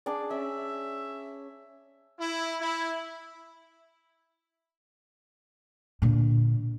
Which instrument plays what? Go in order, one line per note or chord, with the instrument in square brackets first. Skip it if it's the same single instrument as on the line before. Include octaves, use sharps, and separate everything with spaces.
[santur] D4 G#4 D5
[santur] C#4 [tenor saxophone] E5
[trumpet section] E4
E4
[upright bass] A#2 D3